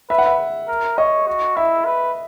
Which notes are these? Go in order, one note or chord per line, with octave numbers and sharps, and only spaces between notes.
B4 E5
F#5
E5
A#4
C#5 D#5
F#4
E4 E5
B4